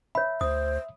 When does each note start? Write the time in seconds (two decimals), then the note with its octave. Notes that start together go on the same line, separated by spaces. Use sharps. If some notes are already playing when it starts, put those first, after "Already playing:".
0.15 C#5 E5 B5
0.41 D2 C5 D#6